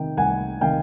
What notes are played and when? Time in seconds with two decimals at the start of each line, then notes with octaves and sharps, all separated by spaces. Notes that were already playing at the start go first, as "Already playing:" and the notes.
Already playing: C3 D#3 G5
0.17 C2 F#5 G#5
0.61 C3 D#3 F5 G5